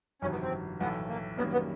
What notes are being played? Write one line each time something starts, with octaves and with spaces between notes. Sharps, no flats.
G1 F2 C3 D#3 F#3 C#4
B3
C4
B1 A2 E3 A3 B3
A#3
F#2 D#3 G3 A#3 B3 C#4
B3